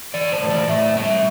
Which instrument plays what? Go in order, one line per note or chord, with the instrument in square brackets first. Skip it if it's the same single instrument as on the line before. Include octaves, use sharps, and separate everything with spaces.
[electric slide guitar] E3 D5
C5
A2
D5
A2 E5
G3 E5